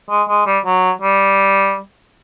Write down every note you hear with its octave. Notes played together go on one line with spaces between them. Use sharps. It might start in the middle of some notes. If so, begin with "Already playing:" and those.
G#3
G#3
G3
F#3
G3